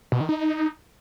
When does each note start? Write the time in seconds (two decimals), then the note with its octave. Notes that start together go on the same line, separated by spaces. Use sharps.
0.12 B2
0.20 D#3
0.29 D#4